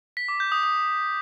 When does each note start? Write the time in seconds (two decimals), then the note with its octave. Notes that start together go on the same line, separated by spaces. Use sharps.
0.17 B6
0.28 D6
0.40 G6
0.52 D#6
0.63 D#6